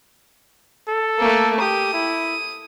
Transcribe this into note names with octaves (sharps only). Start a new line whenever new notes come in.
A4
A3 A#3
G4 D#6
E4